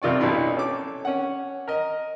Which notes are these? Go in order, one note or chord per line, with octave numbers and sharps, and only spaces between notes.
F2 C3 F4 D5 C#6
B1 B2 D4 E4 C6
C#4 A4 D6
C#4 F#5
A#4 D#5